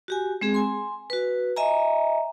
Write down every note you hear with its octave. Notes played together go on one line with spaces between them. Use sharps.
F#4 G4 G#5
G#3 C4 G#4
G#5 C6
F#4 B4
D#5 E5 G#5 A#5